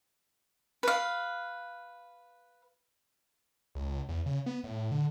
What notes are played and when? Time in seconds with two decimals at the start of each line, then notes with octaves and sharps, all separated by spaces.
0.83 B4 F5
3.75 C#2
4.09 E2
4.26 C#3
4.46 B3
4.64 A2
4.91 D3